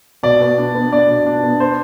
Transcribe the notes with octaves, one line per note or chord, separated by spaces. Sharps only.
B2 D5
B3
D4
B3
D4 D5
B2
D4
B3
C5